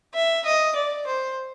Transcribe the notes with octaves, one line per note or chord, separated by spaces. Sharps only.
E5
D#5
D5
C5